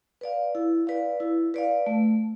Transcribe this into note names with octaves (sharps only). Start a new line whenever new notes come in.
B4 D5 F5
E4
B4 D5 F5
E4
B4 D5 F5
A3